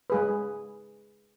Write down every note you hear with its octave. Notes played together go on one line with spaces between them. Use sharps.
G#3 G#4 B4